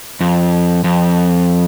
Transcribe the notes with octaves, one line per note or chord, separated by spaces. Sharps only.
F2
F2